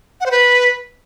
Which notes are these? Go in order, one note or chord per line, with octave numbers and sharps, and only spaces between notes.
F#5
C5
B4